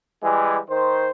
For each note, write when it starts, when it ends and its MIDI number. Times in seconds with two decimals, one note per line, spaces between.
0.22 0.57 52
0.22 0.57 55
0.22 0.57 56
0.70 1.08 51
0.70 1.08 72